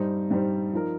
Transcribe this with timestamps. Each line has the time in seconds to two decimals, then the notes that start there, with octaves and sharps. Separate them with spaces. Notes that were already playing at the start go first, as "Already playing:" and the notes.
Already playing: G2 G3 D#4 C5
0.31 G2 G3 D#4 C5
0.73 F3 D#4 A#4